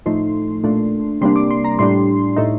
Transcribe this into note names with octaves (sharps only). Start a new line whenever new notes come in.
A2 F3 A3 D#4 C6
A#2 A3 D4
C3 G3 A#3 D4 C6
D6
C6
A#5
A2 G3 D4 C6
A2 A3 D#4